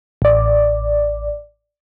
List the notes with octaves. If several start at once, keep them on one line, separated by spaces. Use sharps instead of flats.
A1 D5